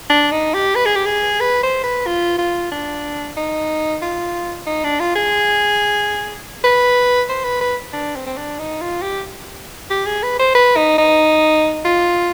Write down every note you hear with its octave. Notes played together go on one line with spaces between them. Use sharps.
D4
D#4
G4
B4
G#4
G4
G#4
B4
C5
B4
F4
F4
D4
D#4
F4
D#4
D4
F4
G#4
B4
C5
B4
B4
D4
C4
C4
D4
D#4
F4
G4
G4
G#4
B4
C5
B4
D#4
D#4
F4